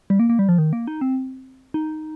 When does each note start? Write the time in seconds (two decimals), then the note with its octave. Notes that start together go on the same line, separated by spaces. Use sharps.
0.10 G3
0.19 A#3
0.30 A#3
0.39 G3
0.49 F3
0.58 D#3
0.73 A#3
0.88 D#4
1.01 C4
1.74 D#4